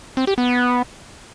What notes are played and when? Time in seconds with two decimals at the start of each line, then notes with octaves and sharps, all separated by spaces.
0.17 C4
0.27 G4
0.38 B3